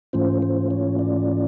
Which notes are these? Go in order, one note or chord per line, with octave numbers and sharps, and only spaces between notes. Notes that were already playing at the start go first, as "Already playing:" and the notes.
G#2 E3 A3 C#4 F4 C5
C5
C#5
D5